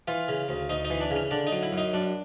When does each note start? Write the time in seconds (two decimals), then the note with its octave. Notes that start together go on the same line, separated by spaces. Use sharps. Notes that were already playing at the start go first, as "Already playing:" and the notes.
0.08 E3 F4
0.28 C#3
0.49 D2
0.69 D2 D#4
0.85 D#4
0.90 E3
1.01 D4
1.11 C#3
1.16 C#4
1.31 D3 D4
1.47 D#4
1.52 F#3
1.63 E4
1.72 F#2
1.78 D#4
1.94 F#2 D4